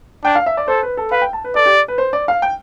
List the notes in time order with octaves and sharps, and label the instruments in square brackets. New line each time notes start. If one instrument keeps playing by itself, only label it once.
[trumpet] D4 [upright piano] G5
[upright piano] F5
E5
D5
[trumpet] A4 [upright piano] C5
[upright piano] B4
A4
[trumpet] B4 [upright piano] F5
[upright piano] G5
A5
B4
[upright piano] A4 [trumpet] D5
[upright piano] G4
B4
C5
D5
F5
G5